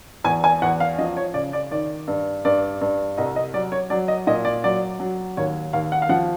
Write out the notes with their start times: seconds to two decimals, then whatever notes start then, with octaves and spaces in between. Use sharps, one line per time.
0.24 E2 G#5
0.44 G#5
0.62 E2 F#5
0.80 F5
0.98 F3 D#5
1.17 C#5
1.34 C#3 D5
1.53 D5
1.71 D#3 D5
2.08 G2
2.45 G2 D5
2.81 G2
3.18 C2 D#5
3.36 D#5
3.54 F#3 D5
3.72 C#5
3.90 F#3 D5
4.08 D#5
4.27 A#2 D#5
4.45 D5
4.64 F#3 D5
5.00 F#3
5.37 D#2 C#5
5.73 D#2 F5
5.92 F#5
6.02 F5
6.09 F3 F#5